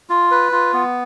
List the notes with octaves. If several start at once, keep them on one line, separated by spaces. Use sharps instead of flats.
F4
B4
F4
B3